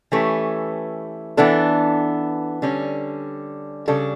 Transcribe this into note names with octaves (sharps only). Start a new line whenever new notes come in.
E3 A3 C#4 G4 B4
E3 B3 D4 A4
D3 G3 C#4
C#3 G3 D4 A4